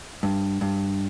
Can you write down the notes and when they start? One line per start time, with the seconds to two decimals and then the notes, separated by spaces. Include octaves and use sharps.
0.23 G2
0.61 G2